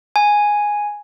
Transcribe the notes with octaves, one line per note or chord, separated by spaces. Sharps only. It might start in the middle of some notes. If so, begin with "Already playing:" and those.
G#5